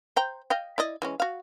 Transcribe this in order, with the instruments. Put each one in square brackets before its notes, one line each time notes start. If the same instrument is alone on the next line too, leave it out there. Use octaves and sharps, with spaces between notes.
[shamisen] C5 G5 A#5
D#5 F5 G5
E4 D5 D#5
E3 G#3 C#4
F#4 F5